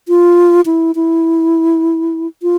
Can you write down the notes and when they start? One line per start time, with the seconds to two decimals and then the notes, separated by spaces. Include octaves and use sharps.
0.08 F4
0.66 E4
0.95 E4
2.43 F4